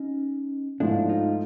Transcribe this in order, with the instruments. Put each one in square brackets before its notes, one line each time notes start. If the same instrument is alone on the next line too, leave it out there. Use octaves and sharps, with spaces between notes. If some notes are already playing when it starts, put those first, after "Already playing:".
Already playing: [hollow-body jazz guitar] C#4 D#4
[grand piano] G#2 F3 A3 [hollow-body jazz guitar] D4 E4
[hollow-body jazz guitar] D#4 F4